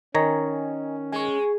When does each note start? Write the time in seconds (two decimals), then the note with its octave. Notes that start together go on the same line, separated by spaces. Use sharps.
0.15 D#3 C#4 A#4 C#5 D#5 G#5 A#5
1.12 G#3 G#5 C#6